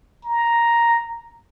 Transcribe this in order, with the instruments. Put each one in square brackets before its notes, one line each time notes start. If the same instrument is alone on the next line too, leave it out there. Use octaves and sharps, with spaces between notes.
[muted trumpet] A#5